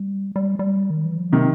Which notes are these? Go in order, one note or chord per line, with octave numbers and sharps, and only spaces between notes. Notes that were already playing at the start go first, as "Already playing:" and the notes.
Already playing: G3
G3
G3
D#3
E3
F3
C3 D#3 F#3